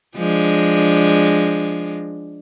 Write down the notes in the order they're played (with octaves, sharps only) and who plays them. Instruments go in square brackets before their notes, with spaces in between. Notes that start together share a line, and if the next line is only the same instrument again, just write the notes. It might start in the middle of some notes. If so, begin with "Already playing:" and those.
[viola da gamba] F3 G#3 D4